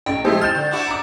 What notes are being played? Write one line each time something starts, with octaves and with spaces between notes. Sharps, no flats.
A1 G5
F3 G3 G#3 C4 E4
F6 G6 A6 E7
D3
D4 E4 F#4
A#5 D6